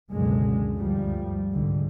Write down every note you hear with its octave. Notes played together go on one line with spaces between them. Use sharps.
C#2 F#2 B2 D3 G#3
D2 G2 F3 G3
C2 G#2 D3